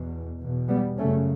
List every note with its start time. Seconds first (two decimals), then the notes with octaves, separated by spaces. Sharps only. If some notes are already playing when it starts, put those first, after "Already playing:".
Already playing: E2 B2
0.38 E2 B2
0.68 G3 B3
0.97 F#2 C#3 A3 C#4